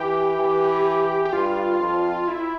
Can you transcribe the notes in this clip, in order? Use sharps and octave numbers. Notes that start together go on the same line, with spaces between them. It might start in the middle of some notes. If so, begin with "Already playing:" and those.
Already playing: E3 G4
E3
G4
G2 F4
F2
E4